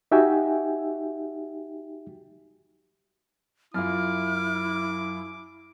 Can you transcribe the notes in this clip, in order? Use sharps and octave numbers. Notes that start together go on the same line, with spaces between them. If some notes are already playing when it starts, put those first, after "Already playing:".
D#4 F#4 G4 E5 G5 G#5
F#2 E4 F4 D6 F6